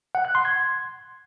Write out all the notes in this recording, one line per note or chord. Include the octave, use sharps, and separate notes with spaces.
F#5
F#6
C6
G#6